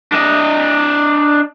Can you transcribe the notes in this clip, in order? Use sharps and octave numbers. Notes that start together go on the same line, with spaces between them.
D4 D#5